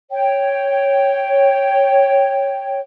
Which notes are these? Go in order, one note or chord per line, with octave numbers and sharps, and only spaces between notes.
C#5 G5